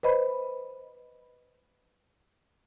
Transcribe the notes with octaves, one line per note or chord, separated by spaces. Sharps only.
B4 C5 D#5 B5